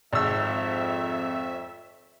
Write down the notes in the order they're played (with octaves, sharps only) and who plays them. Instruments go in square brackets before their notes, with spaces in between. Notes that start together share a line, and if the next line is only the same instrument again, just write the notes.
[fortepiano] G#1 E6 [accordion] F2 E5